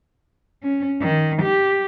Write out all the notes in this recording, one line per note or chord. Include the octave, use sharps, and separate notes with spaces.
C#4
D#3
G4